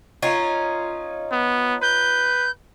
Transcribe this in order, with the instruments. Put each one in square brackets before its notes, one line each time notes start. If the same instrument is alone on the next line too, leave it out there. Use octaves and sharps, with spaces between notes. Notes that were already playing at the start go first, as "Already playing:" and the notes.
[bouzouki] C#4 D#4 F4
[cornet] B3
[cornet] B4 [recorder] G6